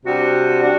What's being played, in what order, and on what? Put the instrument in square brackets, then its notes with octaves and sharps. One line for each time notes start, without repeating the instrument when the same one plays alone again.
[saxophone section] C3 G3 D4 F#4
G3 D4 F#4